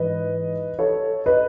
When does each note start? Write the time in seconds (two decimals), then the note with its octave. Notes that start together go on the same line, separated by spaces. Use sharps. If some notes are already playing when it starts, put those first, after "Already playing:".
Already playing: G#2 E3 B4 D#5
0.79 A4 C#5
1.26 B4 D#5